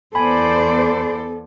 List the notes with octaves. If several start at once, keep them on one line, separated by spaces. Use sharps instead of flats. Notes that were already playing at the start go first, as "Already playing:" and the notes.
E2 B3 A4 C5 D5 G#5 B5